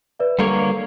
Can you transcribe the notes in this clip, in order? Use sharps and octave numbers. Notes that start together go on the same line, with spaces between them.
B4 D5 E5
D3 G3 A#3 A4 C#5